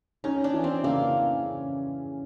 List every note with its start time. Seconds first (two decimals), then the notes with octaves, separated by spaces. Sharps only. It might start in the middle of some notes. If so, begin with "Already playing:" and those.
0.24 C#4 D#4
0.44 D4
0.54 E3
0.64 C4
0.84 C#3 A#3